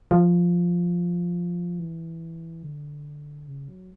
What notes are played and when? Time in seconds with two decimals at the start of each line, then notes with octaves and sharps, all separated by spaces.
0.11 F3
1.79 E3
2.63 D3
3.47 C#3
3.68 F#3